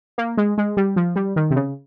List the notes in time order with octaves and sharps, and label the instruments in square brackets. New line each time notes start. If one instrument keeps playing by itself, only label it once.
[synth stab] A#3
G#3
G#3
G3
F3
G3
D#3
C3
C#3